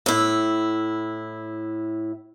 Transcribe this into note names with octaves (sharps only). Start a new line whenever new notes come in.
A2 E4